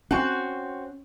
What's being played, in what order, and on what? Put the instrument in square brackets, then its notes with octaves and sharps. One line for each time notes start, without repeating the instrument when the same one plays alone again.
[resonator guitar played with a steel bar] C4 F#4 [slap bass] C#4